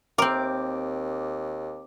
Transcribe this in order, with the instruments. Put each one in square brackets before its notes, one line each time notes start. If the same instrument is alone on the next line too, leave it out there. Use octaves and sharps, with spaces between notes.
[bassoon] D#2 [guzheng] C4 A#4 [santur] D6